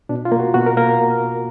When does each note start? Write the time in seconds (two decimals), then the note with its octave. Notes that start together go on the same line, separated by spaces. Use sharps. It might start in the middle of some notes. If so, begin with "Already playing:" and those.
0.09 B2 D4
0.25 F4
0.32 A#3
0.39 F#4
0.54 B2 F#4
0.66 A#4
0.77 A#3 A#4